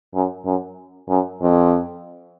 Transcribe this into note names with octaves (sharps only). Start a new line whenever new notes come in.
F#2
F#2
F#2
F2